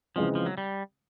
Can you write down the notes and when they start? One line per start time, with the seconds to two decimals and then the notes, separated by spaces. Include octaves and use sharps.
0.16 C#3 E3 F3 G#3 C4
0.35 F3
0.46 F#3
0.58 G3